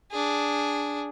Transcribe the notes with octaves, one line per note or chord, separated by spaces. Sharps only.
D4 G#4